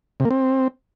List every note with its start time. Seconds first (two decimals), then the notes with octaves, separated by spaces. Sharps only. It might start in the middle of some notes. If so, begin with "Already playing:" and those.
0.20 C3
0.25 A#3
0.31 C4